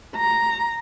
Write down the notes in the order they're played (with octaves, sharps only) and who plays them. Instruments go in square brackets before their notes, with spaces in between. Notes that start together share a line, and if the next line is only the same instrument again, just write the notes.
[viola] A#5